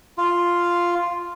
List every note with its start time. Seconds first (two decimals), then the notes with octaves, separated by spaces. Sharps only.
0.18 F4